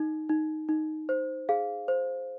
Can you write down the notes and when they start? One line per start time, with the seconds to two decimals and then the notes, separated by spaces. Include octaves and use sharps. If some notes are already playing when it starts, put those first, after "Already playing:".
Already playing: D#4
0.29 D#4
0.69 D#4
1.09 C5
1.49 G#4 F5
1.88 C5